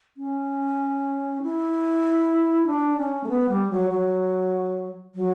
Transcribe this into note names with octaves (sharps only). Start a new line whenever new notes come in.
C#4
E4
D4
C#4
A3
B3
G3
F#3
F#3
F#3